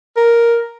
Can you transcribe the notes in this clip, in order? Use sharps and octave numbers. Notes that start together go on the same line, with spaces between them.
A#4